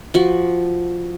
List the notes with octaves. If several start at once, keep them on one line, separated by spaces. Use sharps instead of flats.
F3 F#4